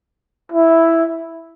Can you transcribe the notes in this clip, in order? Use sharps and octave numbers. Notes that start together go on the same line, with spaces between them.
E4